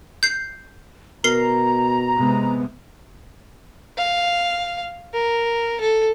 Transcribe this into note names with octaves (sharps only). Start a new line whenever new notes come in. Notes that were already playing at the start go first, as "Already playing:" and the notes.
G6 C7
B2 A#4 A#5 C7
C3 G#3 B3
F5
A#4
A4